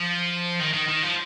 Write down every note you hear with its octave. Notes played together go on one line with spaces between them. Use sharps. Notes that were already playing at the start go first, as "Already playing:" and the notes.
Already playing: F3
D#3
D#3
D#3
F3